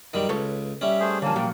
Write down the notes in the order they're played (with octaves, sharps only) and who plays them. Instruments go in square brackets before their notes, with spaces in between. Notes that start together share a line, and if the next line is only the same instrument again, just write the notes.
[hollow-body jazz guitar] F#2 [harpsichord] D#3 G3
[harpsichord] C#2 [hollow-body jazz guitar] A4 B4 C#5
[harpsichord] G3 C#4 [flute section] E5
[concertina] A3 G#4 C5
[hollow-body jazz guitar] D3 F3 [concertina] A#3 [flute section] C#5 G#5 A5
[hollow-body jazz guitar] A#2 F3 F#3 [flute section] G5